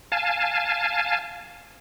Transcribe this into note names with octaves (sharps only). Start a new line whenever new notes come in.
F5 G#5 A5